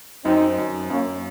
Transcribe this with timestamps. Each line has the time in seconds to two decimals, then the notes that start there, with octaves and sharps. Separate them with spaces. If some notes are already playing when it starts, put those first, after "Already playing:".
0.24 F#2 C4 D#4
0.58 F#2
0.90 F#2 A#3 C#4